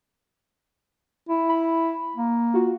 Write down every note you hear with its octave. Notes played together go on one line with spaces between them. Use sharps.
E4
B5
A#3
F4 F#4